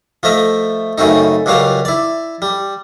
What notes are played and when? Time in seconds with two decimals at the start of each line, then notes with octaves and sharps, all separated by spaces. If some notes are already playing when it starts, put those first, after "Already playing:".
0.23 F3 A3 D#5 E5
0.98 F#2 C#3 A3 C4 D#4
1.46 C#2 A#2 F#3 G3 F5
1.85 E4 D5
2.42 G3